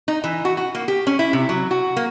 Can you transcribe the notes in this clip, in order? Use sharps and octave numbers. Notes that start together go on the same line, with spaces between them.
D#4
E3
F#4
F#4
A#3
G4
C#4
E4
C3
F#3
F#4
A#3